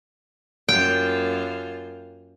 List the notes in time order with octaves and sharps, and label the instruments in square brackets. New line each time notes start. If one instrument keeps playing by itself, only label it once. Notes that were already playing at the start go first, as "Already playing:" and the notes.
[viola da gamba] F#2 A#3 F4 [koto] G5